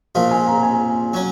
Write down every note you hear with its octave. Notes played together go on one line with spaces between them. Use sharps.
A#1 A#2 F3 F5
G#5
A#5
G#5
F#3 C#4